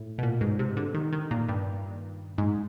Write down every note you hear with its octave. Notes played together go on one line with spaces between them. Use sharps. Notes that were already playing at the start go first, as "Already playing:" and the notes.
Already playing: A2
B2
A#2
G#2
C3
D3
D#3
D#3
A#2
G2
G#2